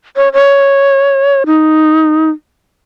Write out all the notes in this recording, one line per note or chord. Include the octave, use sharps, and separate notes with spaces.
C#5
C#5
D#4